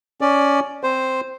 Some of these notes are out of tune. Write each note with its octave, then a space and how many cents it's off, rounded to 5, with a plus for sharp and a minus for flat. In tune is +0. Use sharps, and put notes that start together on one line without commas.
C#4 +15 D5 +10
C4 -5 C5 +0